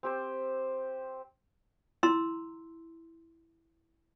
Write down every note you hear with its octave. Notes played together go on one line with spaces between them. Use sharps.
C4 G4 C5
E4 A#5 C6 E6